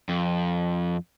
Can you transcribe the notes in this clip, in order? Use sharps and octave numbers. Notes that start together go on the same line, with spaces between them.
F2